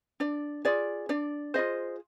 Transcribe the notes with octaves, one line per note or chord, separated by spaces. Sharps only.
D4 D5
F4 G#4 D5
D4 D5
F4 G#4 C5 D#5